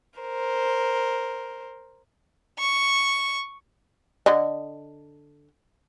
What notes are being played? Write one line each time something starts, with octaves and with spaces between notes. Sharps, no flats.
A#4 C5
C#6
D3 D#5